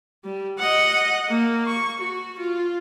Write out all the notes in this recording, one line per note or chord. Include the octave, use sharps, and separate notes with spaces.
G3
D#5 F#5
A#3
C#6
F#4
F4